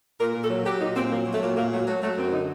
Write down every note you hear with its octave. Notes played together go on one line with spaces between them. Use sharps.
A#2 A#4
A#2
A4
F#3
F#3 G4
A#2 D#4
A#2 C4
F#3 A#3
F#3
A3
A#2
A#2 A#3
F#3 A3
F#3 A3
F#3 A3
F#2 C4
D3 D#4